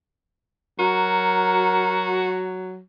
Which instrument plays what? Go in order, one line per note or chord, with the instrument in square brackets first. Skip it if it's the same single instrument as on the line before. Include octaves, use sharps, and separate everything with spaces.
[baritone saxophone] F#3 [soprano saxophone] F#4 [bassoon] A#4